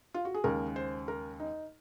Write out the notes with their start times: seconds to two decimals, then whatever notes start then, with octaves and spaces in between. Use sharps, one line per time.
0.14 F4
0.25 F#4
0.34 G#4
0.44 D#2 C#3 G#3 A#4
0.76 C5
1.08 A#4
1.40 D#4